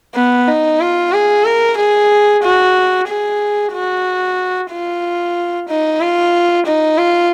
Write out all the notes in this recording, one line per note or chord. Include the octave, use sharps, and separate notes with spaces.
B3
D#4
F4
G#4
A#4
G#4
F#4
G#4
F#4
F4
D#4
F4
D#4
F4